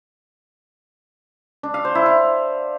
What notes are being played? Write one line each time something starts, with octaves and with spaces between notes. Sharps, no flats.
D4
F5
C5
E4
F5